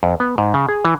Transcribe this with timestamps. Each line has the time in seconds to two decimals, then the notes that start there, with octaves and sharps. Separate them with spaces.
0.03 F2
0.20 B3
0.38 G#2
0.54 C#3
0.69 G#4
0.85 E3